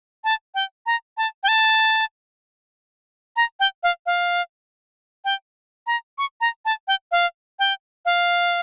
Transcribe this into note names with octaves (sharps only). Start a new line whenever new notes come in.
A5
G5
A#5
A5
G5
A5
A#5
G5
F5
F5
G5
A#5
C#6
A#5
A5
G5
F5
G5
F5